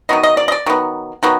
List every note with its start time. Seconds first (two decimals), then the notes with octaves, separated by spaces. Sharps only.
0.09 D#3 F#3 B3 D#5
0.23 D#5
0.37 D5
0.48 D#5
0.52 D5
0.66 D#3 F#3 B3
1.23 D#3 F#3 B3